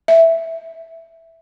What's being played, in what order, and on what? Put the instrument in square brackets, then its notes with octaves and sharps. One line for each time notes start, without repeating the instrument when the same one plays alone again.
[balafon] E5